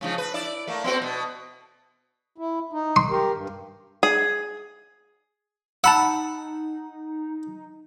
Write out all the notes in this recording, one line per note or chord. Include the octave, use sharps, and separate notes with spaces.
G#2 C#3 F3
B4
E4 D5
A3 A#3
B3 C4 F#4
B2
E4
D#4
C6
G4 A#4
G2
G#4
D#4 F#5 A5 B5 E6